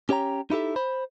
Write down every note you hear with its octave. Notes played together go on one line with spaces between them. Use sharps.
C#4 G4 C#5 G5 A#5
D#4 E4 G4 A4 E5
C5 B5